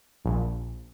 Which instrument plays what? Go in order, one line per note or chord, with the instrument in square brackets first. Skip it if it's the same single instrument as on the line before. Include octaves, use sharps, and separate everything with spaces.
[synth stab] A#1